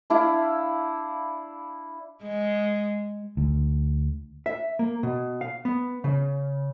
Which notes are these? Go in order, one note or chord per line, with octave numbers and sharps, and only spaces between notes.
D4 E4 D5 F5
G#3
D2
E5
A#3
B2
F5
B3
C#3